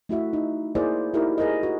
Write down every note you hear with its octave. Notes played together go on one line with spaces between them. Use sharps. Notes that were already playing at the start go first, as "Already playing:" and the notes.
A3 E4 F#4 E5
D#4
A#3 E4 G#4 A#4 C5 D5
D#4 E4 F#4 G4 A#4
G#4 A#4 C5 D#5
F#4